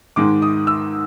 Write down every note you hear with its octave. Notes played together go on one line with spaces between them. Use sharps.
G#2 D#3 G#3 D6
D#6
E6